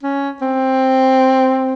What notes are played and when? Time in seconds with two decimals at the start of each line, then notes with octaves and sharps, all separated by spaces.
0.03 C#4
0.41 C4